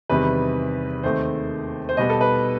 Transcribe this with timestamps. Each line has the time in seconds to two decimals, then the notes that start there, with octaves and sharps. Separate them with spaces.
0.10 E2 C3 D#3 G3 B4
1.03 D#2 D#3 A3 C4 C5
1.89 C5
1.97 B2 G3 B3 D#5
2.10 A4
2.21 B4